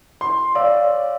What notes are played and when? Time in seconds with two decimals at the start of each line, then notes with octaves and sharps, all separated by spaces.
0.21 C6
0.55 C#5 D5 F5 E6